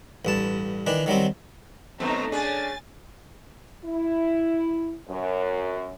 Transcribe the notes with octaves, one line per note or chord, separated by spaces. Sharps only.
A1 G2 A5
D#3 E3 D4
D#3 F#3 G3 C4
F#2 D#3 F#3 A3 B3 C4 D#4 A#5
C#3 C#4 D4 G#4 G#5 A6
E4
F#2